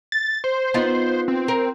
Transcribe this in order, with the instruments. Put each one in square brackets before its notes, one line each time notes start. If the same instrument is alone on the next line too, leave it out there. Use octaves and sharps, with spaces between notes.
[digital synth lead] A6
C5
[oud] B3 D#4 F4
[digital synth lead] C4
[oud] A#4